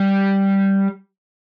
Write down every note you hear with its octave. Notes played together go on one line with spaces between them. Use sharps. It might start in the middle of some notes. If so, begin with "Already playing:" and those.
Already playing: G3